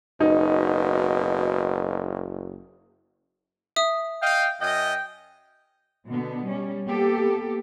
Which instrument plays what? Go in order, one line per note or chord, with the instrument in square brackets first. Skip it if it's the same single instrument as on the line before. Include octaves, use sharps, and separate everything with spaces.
[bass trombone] F#1 [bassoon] B2 [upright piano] D#4
[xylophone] E5 D#6
[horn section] D#5 F5 [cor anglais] G5
[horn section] F#2 D#5 [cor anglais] G5
[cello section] B2 D3 B3
G3 C#4
A#3 B3 G4 A4